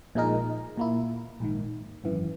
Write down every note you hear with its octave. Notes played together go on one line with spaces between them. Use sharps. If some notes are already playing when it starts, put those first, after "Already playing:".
A#1 A#2 G#3 D#4 A#4
A#2 A#3 E4
A#1 G#2 D#3
G#1 F#2 E3